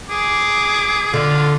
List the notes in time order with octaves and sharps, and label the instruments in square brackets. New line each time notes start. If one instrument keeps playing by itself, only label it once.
[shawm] G#4 [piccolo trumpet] D6
[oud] D3 [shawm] F4